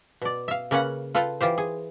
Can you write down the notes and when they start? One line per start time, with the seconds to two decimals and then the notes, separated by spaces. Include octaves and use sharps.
0.22 B2 D5
0.48 E5 F5
0.71 C#3 A#3 C#4 B4 F#5
1.15 F4 A4 B4 F5 G5
1.41 E3 F4 G4 C5
1.58 G#4